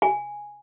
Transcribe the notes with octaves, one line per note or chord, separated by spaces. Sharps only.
G#5